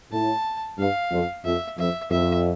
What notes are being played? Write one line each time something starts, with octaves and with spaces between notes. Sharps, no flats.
A2 A5
G2 F5
F2
F2 E5
F2 E5
F2 E5